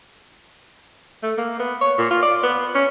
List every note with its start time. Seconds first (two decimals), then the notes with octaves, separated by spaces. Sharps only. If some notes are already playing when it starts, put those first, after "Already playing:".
1.23 A3
1.38 A#3
1.59 B3
1.81 C#5
1.98 A#2
2.11 F4
2.23 D5
2.43 B3
2.75 C#4